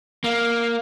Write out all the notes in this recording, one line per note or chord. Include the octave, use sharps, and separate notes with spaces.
A#3 F5